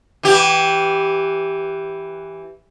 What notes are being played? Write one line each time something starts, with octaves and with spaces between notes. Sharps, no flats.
E3 G4